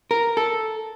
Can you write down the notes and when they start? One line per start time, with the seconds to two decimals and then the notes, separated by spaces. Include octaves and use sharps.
0.11 A#4
0.37 A4